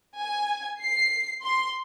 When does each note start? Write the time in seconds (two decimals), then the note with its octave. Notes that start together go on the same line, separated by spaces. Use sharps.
0.20 G#5
0.83 C7
1.44 C6